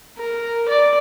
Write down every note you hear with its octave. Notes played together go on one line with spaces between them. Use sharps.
A#4
D5